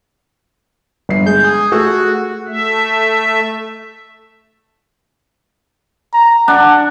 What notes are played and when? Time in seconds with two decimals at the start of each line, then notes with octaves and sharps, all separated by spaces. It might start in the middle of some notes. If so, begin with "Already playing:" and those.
1.09 G1 C7
1.26 G#3 G6
1.44 G#4
1.72 A3 F#4 G#4 E6
2.48 A3 E5
6.13 A#5
6.48 D4 F#5